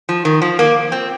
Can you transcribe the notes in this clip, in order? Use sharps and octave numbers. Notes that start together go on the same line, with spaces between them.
F3
D#3
F3
A#3
C4